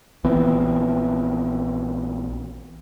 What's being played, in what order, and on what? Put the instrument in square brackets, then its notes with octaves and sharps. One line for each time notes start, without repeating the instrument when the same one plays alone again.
[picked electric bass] A#1 E3 B3 C4